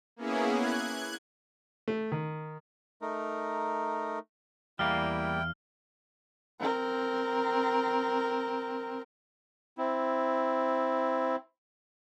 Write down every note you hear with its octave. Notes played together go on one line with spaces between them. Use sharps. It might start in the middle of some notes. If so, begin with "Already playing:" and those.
A#3 B3 C#4 E4 G#4
F#6 G#6
A3
D#3
A3 D#4 A#4
E2 G3 A#3 E4 D5 F5 G5 F6
C4 A#4
C4 E4